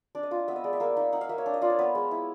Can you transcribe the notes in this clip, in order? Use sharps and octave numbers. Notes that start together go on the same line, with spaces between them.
D4 D5
D#5
F4 F5
D#5
B3 E5
D#5
G#3 D5
E5
A#3 F5
D#4 E5
D#4 F#5
F5
A#3 E5
C#5
D4
D#5
F4 D5
C#5
B3 B4
G#3
E4